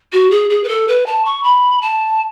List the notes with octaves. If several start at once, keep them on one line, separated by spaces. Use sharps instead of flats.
F#4
G#4
G#4
B4
A4
B4
A5
C#6
B5
A5